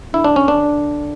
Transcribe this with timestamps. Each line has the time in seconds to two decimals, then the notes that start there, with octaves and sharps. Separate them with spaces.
0.13 D3 E4
0.24 D4
0.36 C#4
0.48 D4